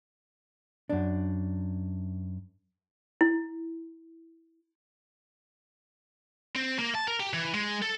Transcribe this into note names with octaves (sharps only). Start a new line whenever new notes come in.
F#2 D4
E4
C4
A#3
A5
A#4
G4
E3
G#3
A4